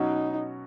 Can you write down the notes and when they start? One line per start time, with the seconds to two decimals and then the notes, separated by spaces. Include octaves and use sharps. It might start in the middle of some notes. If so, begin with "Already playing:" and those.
Already playing: B2 F#3 C#4 D#4 F#4